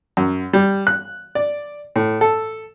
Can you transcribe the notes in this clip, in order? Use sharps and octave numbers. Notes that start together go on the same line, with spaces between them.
F#2
G3
F#6
D5
A2
A4